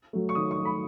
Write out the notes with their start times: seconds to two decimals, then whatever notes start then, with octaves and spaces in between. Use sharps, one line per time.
0.13 F#3 A3
0.29 C#6
0.35 D#3 D#6
0.51 C#6
0.58 F#3 A3
0.65 B5